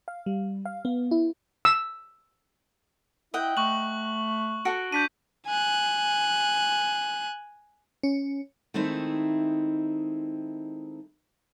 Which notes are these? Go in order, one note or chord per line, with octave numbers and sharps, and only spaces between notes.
F5
G3
F5
B3
E4
E6
E4 D#5 F#5 G5
A3 C#6 F#6 F#7
F#4 A4 D7
D4 G6 B6 D#7
G#5 F#6
C#4
D#3 G#3 A3 C4 D#4 E4